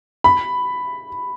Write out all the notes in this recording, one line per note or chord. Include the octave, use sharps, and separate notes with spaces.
B5